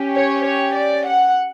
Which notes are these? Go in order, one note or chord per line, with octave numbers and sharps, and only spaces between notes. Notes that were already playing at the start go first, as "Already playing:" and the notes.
Already playing: C#4 G4
C#5
C#5
D5
F#5